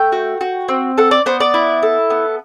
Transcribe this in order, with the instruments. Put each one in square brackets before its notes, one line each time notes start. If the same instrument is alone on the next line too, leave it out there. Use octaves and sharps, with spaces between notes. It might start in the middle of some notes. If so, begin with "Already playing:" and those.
Already playing: [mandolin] A3 G5
F#4
F#4
C4
A4 F#5
D5
B3 C5
D5
E4
A4
B3